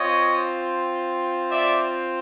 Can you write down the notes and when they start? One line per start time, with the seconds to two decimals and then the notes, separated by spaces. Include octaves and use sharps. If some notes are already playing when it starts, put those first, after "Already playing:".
Already playing: C4 F4 C#5 D#5
1.51 D5 E5